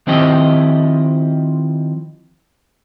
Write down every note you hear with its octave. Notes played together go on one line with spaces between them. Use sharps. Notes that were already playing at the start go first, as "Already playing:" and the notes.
D#3 F3 C4 E4 G4 D#5